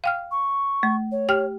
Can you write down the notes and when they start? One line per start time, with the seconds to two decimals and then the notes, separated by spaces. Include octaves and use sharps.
0.04 F5 G5 F6
0.31 C#6
0.83 A3
1.11 C#5
1.29 G4 G5 F6